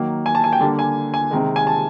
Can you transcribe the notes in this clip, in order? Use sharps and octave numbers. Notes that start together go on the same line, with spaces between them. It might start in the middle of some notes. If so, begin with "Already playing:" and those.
Already playing: D#3 F#3 A#3
G#5
A5
G#5
G5
D3 G3 A#3 A5
G#5
G#5
C3 D#3 G#3
G#5
A5